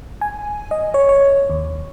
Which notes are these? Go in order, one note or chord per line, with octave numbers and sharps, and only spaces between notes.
G#5
D#5
C#5
C#5
D#2